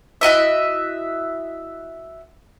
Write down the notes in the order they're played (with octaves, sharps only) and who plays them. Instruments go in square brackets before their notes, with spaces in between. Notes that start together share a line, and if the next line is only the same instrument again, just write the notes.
[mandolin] E4 F#4 D#5 E5